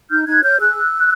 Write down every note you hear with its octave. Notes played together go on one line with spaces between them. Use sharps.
D#4 F6 G6
D#4 F#6 G#6
C#5 F6 G6
G#4 E6 F#6